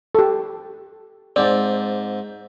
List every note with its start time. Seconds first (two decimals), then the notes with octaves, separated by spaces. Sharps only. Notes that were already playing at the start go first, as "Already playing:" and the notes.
0.15 G4 A4
1.36 G#2 C4 D5